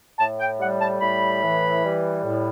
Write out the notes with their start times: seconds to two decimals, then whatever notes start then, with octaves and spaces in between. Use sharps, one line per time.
0.19 A2 A5
0.39 G5
0.60 G3 F#5
0.80 A5
1.01 A2 B5
1.42 E3
1.83 G3
2.25 A2